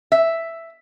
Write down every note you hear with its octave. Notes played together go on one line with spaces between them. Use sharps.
E5